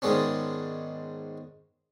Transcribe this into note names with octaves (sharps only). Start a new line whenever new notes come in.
G#2 D#3 G#3 B3 C#4 D4